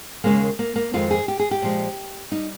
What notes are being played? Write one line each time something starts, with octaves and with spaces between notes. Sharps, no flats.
D#2 C#3 G#3 A#3
A#3
A#3
F2 D#3 G#3 F4
G#4
G4
G#4
G4
A#2 F3 G#3
G3 D#4